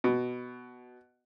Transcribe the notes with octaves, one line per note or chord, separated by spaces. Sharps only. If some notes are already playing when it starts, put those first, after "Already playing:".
B2